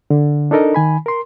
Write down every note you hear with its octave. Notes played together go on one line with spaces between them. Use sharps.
D3
D4 D#4 A4 A#4 D#5
D#3 G#5 B5
A#4 C6